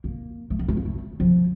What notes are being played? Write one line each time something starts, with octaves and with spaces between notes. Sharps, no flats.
A#3
A3
A#3
A3
A#3
A3
F3